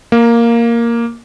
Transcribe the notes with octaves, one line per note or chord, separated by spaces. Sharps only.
A#3